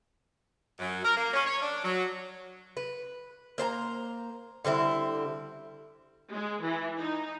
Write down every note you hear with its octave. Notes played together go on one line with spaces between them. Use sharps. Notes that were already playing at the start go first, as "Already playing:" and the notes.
F#2
A#4
A#3
C#4
C#5
D4
F#3
B4
A#3 C5 A5 A#5
D3 G3 C4 E4
G#3
E3
D#4